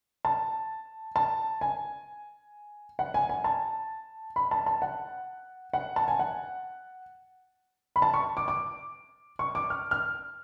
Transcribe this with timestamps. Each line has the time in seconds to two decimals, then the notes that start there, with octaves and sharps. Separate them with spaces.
0.25 A5
1.16 A5
1.61 G#5
2.99 F#5
3.14 G#5
3.29 G#5
3.44 A5
4.36 B5
4.51 A5
4.66 A5
4.82 F#5
5.73 F#5
5.96 A5
6.08 G#5
6.19 F#5
7.96 B5
8.02 A5
8.14 C#6
8.37 D6
8.48 D6
9.39 C#6
9.55 D6
9.70 F6
9.91 F6